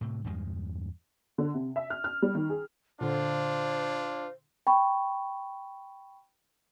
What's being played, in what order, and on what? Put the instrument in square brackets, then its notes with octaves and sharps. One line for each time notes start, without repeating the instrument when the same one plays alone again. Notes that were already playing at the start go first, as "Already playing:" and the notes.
[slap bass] A2 C3
E2 G2 A#2 G#3
[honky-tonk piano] D3
C3
E5
F6
F6
G3
D#3
G#4
[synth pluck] A#2 D3 [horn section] D4 F4 [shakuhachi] C5
[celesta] G5 B5 C#6